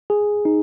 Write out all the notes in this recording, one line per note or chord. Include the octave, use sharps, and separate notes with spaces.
G#4
D#4